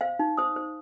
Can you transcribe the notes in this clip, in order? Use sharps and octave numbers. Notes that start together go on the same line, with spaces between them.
C5 F5
D#4
C5 D#6
C5